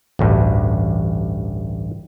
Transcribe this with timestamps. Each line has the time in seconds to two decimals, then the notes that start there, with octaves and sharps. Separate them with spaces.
0.19 A1 D2 G2